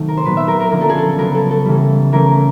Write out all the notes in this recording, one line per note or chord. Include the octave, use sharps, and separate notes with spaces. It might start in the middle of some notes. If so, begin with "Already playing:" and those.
Already playing: C3 D#3 F#3 A3
A#4
C5
A#2 F#3 B3 B4
E5
A#4
A#4
D3 F3 A#3 C#4 A#4
A4
G#4
A4
C#3 F#3 B3 A#4
A4
A4
C#3 E3 G3
E3 A3 C#4 A#4